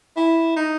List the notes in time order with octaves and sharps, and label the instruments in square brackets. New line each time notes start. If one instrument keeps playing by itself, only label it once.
[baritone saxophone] E4
D#4